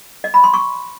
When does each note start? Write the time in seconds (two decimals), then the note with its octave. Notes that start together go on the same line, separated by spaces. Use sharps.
0.24 D#5
0.34 B5
0.44 C6
0.54 C#6